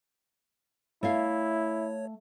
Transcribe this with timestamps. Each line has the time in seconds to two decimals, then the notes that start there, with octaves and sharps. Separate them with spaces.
1.03 A3 E4 C#5 E5 F5